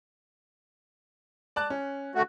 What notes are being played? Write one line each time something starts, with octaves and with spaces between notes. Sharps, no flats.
D5 A5 F#6
C#4
D2 A3 F#4